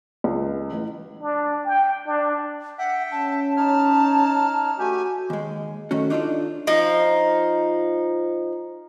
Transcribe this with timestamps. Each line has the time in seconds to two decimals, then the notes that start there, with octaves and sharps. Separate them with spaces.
0.24 C#2
0.72 A1
1.20 D4
1.66 G5
2.07 D4
2.79 E5 F#5 G5
3.12 C#4 A5
3.57 D#4 C#5 A5 F6
4.79 A3 F#4 G4 G#5
5.30 D#2 G#3
5.91 D#3 A3 C#4 F#4
6.10 D4 D#4 F4 G#4 A4 D5
6.67 F3 D#4